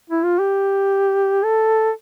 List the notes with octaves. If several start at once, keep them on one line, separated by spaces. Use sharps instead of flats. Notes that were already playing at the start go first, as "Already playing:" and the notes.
E4
F4
G4
A4